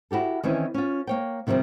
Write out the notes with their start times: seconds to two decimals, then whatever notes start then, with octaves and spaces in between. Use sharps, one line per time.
0.11 E4 F#4 G4 A4
0.44 D#3 E3 C4 C#4 E5
0.74 C#4 F4
1.07 A#3 C#5 G5
1.47 C3 D#3 F3 G3 C4